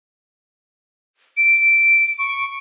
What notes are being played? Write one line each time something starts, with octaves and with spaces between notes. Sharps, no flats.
D7
C#6